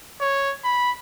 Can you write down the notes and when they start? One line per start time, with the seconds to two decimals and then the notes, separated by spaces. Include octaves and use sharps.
0.21 C#5
0.64 B5